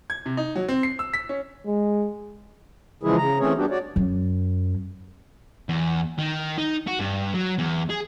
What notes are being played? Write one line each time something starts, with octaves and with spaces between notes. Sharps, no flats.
G#6
C3
D#4
F#3
C4
C7
E6
B6
C#4
G#3
C#3 E3 F3 G#3 E4 G#4
C#3 A#5
E3 A3 C4 C#4 G#4 C#5
G3 B3 D4 F#4 G4
F#4 C#5 D5
F#2
E2
D#3
D#4
F#4
G2
F#3
E2
G#4